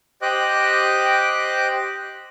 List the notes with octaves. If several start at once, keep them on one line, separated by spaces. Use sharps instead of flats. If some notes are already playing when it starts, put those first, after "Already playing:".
G4 C5 D#5 G5 D6 F#6